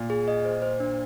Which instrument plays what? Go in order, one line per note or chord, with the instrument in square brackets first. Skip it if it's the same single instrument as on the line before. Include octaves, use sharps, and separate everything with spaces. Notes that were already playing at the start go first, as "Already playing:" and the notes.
Already playing: [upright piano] A#2
[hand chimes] G#4
D#5
C5
C5
D4